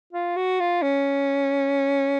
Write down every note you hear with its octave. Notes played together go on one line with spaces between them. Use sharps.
F4
F#4
F4
C#4